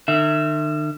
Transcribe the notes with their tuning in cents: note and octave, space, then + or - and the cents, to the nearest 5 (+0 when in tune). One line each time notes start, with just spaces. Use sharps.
D#3 -45 E5 +0